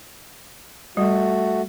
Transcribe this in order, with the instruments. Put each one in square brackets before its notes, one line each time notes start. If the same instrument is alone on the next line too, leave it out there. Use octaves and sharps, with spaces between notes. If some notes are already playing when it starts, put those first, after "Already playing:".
[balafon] G3 [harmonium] A3 F#4